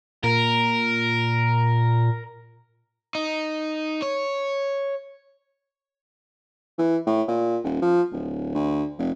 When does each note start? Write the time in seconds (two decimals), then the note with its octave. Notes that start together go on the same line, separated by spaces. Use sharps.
0.24 A#2 A#4
3.15 D#4
4.02 C#5
6.78 E3
7.07 A2
7.28 A#2
7.64 D#1
7.82 F3
8.12 D1
8.54 D2
8.99 F1